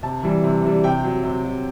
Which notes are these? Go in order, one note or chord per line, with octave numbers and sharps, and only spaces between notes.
C3 A5
E3 G3
C3
E3 G3
C3 G5
F#3
C3
F#3